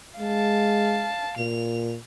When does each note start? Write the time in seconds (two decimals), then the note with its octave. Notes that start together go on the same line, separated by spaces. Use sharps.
0.19 G#3 F5 A5
1.37 A#2 F7